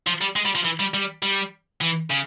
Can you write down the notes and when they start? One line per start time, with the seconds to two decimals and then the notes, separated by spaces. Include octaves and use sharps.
0.07 F3
0.21 G3
0.36 G#3
0.45 G3
0.55 F3
0.65 E3
0.80 G3
0.94 G3
1.23 G3
1.81 E3
2.10 C#3